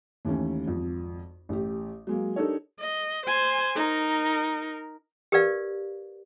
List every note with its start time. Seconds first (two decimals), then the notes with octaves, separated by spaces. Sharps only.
0.25 D#2 D#3 E3 A3 C#4
0.66 G#1 F2
1.49 A1 G4
2.07 F#3 G#3 A#3
2.36 D4 D#4 G4 A4 A#4 C#5
2.80 D#5
3.26 C5 G#5
3.76 D#4 A#4
5.32 G4 A#4 B4 D5 F5